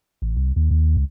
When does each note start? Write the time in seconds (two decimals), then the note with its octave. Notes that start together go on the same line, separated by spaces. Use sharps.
0.22 A1
0.36 C2
0.56 D#2
0.71 D#2
0.97 C#2